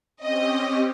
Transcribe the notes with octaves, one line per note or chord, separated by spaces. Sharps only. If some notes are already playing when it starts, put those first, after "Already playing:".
C4 C#4 G4 D#5